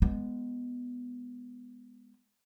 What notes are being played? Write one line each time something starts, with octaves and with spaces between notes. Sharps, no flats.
G#3 B3